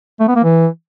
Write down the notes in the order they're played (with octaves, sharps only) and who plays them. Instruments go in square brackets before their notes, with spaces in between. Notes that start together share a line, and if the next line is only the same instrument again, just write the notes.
[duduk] A3
B3
A#3
E3